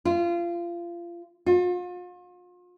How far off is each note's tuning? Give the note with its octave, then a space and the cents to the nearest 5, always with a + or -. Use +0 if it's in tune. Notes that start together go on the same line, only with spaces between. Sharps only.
F4 -25
F4 +40